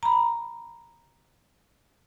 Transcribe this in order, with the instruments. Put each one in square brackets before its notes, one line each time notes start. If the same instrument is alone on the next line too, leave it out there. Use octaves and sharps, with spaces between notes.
[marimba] A#5 B5